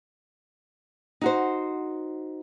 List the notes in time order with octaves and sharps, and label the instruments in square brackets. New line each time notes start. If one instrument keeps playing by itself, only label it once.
[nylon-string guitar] D#4 F#4 C5